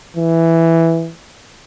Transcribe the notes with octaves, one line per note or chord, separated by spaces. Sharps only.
E3